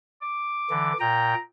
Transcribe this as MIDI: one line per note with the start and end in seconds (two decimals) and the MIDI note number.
0.22 0.98 86
0.70 0.93 50
0.70 0.93 52
1.00 1.34 46
1.00 1.34 79
1.00 1.39 82